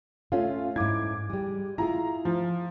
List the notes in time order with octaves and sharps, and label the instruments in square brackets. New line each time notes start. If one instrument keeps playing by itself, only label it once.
[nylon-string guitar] A3 C#4 [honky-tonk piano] F4
[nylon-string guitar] G#2 E4 [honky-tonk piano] D6 G#6
[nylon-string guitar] G3 G#3
[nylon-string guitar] E4 F4 G#4 [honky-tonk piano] A#5
[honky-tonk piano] F3